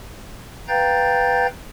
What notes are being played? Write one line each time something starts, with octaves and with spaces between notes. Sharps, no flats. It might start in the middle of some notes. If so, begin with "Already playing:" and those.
B4 F5 G5 A#5 G6 A6